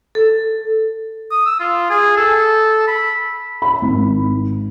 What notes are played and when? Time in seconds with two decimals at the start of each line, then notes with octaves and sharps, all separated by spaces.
0.15 A4
1.31 D#6
1.46 E6
1.60 F4
1.90 G#4
2.17 A4
2.87 B5
3.62 B5
3.82 G#1